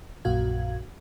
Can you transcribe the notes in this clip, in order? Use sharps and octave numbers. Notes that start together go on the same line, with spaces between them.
A#1 F#2 A#2 F#4 F5 G#6